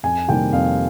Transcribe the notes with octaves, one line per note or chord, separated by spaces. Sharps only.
F2 G#5
C3 D#3 G3 A#3 G5
F2 F5